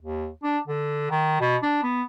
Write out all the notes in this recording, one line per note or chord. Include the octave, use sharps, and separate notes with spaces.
D#2
D4
D3
D#3
B2
D4
B3